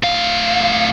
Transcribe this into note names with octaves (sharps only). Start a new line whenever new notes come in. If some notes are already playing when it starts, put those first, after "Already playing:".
A2 F5